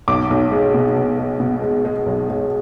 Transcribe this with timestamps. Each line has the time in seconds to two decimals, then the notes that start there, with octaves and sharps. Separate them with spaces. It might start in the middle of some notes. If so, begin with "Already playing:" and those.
0.08 B1 D6
0.30 B1
0.52 G#3
0.74 B2
0.96 B2
1.18 G#3
1.40 B2
1.62 G#3
1.85 G#3
2.06 B1
2.29 G#3